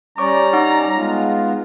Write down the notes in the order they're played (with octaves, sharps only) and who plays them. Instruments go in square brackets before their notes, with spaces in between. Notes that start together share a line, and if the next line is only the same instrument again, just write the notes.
[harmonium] G3 C#4 D5 [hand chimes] C#5 C#6 D6 [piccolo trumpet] A#5
[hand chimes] D#4 F#5 D6
[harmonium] G#3 B3 F4